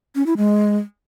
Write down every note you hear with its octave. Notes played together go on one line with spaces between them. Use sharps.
C#4
E4
G#3